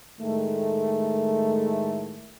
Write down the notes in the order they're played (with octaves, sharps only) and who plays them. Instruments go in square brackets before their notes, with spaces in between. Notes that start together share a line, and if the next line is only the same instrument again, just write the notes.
[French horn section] A2 D#3 G#3 A3